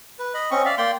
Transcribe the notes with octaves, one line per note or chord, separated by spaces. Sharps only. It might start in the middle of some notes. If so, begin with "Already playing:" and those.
B4
D#5 B5
C4 C#4 D#5 C#6
D5 E5 F5
A#3 D5 G5 C6